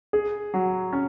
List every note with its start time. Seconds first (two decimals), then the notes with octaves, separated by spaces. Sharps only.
0.13 G#4
0.54 F#3
0.93 C#4